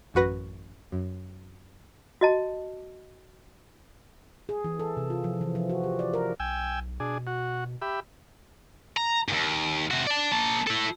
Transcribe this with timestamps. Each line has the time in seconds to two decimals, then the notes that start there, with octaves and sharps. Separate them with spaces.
0.14 A1 F#2 F#4 B4 A#6
0.92 F#2
2.21 F#4 D#5 A5
4.49 G#4
4.64 E3
4.79 A4
4.97 C3
5.10 F4
5.24 F3
5.41 E3
5.55 F3
5.69 F#4
5.84 G4
5.99 D5
6.14 A#4
6.40 B1 G5 G#5 E6
7.00 B2 D4 G#4
7.27 F#4
7.82 G4 E5 B5
8.97 A#5
9.29 D#2 G#2
9.91 C3 F#4
10.07 D5 A5
10.32 A#3 A5
10.67 E4 A4